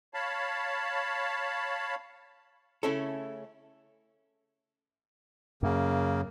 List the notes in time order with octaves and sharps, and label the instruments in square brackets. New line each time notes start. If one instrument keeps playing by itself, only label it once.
[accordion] C#5 F5 A5 B5
[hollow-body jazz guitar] C#3 A3 C#4 E4 A4
[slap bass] F#2 [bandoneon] C#3 A#3